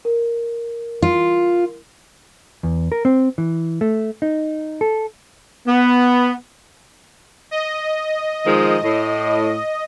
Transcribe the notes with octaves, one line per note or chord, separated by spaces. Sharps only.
A#4
F4
E2
A#4
C4
E3
A3
D#4
A4
B3
D#5
D#3 F3 G#3
A2